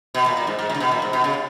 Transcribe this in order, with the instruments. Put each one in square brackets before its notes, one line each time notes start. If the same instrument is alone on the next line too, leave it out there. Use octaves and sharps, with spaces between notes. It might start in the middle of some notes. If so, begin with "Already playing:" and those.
[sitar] B2
A#2
A#2
G#2
G#2
A#2
C#3
B2
A#2
G#2
B2
C#3